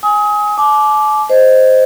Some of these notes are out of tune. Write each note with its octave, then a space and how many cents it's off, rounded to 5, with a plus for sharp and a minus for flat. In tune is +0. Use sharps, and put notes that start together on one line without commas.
G#5 +0 D#6 +30
A5 -45 D6 +0
C5 -5 D#5 +0